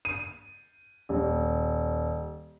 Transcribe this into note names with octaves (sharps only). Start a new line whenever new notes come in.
D#7
D#1